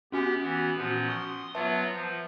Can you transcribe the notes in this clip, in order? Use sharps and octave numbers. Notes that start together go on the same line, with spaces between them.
B3 C#4 F#4 G4 G#5
E3 B3
A#2 F3 B3 C#4 F#4
C6 C#6 D#6
F#3 B3 F4 B4 E5 A5
F3